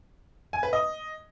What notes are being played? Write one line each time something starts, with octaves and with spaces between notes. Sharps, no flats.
G#5
B4
D#5